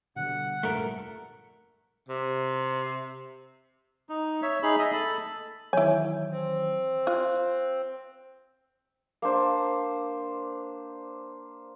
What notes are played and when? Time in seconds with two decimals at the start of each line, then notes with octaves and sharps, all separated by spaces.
0.16 B2 D3 G3 F#5
0.63 F1 A#1 G2 A3 A#4
2.09 C3
4.09 D#4
4.42 C#5 E5
4.63 D#4 G#4 B5
4.79 D#5 E5
4.93 A4 B5
5.73 D#3 E3 F#3 E4 C#5 G#5
6.31 C4
7.07 F4 F#6
9.22 A#3 D4 C5